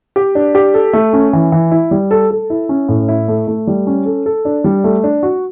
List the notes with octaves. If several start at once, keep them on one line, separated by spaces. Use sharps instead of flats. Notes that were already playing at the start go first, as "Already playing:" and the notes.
G4
D4
G4
A4
A3
C#4
E3
E3
E4
G3
A4
A4
E4
C#4
A2
E4
A3
A3
G3
C#4
A4
A4
D4
G3
A3
D4
F#4